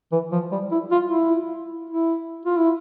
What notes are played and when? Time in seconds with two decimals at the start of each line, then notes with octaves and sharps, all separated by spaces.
0.12 E3
0.32 F3
0.51 G3
0.72 E4
0.91 F4
1.11 E4
1.90 E4
2.46 F4
2.58 E4